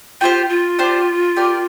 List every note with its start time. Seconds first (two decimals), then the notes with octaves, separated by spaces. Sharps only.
0.21 F4 G4 C5 G5
0.49 F4
0.79 D4 G4 C5
1.36 G4 A#4 D5